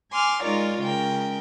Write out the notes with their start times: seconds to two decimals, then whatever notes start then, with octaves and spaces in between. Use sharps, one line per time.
0.12 G#5 C6 D6 F6
0.43 G#3 D#4 F4 A#4 C#5 D5
0.81 C#3 G#3 A#4 G5